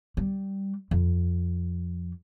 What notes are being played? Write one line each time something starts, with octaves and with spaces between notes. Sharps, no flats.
G3
F2